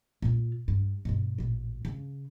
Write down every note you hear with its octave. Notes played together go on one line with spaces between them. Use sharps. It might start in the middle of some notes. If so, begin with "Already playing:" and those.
A#2 F4
G2
G2 B2
A1 A#2
C#3